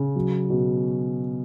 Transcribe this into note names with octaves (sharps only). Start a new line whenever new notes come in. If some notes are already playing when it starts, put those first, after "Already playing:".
Already playing: C#3
F#3
B2